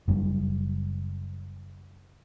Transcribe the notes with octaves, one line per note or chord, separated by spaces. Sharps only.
F#1 F#2 B2 G3